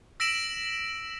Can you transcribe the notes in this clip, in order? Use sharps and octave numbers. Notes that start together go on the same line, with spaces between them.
E6 A#6 B6 D7 E7 F#7